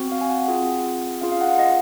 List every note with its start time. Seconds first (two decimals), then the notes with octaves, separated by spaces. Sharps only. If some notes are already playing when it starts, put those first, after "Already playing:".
Already playing: C4 F#4
0.12 F5
0.21 G#5
0.29 F#5
0.48 C4 F4 G#4
1.21 C#4 F4 G#4 F5
1.32 F5
1.41 F#5
1.50 F5
1.59 D#5